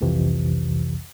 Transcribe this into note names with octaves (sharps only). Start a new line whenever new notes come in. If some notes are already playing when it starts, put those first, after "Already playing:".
G1 C2 F2 C3 E3